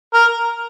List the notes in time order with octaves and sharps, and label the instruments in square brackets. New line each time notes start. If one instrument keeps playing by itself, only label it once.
[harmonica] A#4